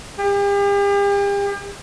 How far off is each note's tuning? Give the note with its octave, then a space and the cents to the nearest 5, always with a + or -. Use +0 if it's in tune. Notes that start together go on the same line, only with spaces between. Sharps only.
G4 +40